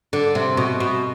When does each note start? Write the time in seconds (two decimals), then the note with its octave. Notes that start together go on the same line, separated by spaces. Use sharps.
0.13 D3
0.35 C3
0.57 B2
0.80 B2